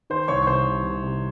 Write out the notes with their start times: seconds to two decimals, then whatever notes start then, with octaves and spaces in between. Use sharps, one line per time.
0.10 D#3 C5 C6
0.28 C2 C#5 C#6
0.42 C#6
0.47 C3 C5 C6
0.66 C2
0.84 C3
1.03 C3